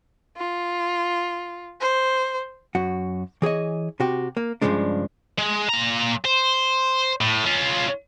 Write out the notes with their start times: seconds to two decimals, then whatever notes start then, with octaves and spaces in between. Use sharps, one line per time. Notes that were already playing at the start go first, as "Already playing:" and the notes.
0.37 F4
1.81 C5
2.75 F#2 F#4
3.42 E3 G#4 C#5 D#5
4.00 C3 F#4 G4
4.37 A#3
4.62 G2 A#2 C#3 F3 G#3 D4
5.38 G#3
5.69 A#2 A#5
6.25 C5
7.21 A2
7.45 C#4 F4